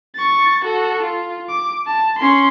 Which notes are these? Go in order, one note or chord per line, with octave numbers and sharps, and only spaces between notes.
C#6 A6
F#4 A4
F4
D6
A5
C#4 C6